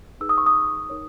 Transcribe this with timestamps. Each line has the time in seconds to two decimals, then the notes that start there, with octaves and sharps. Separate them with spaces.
0.20 D#4 G#4 B4 E6
0.29 D#6
0.38 C#6
0.46 D#6
0.90 D#4 A#4 C#5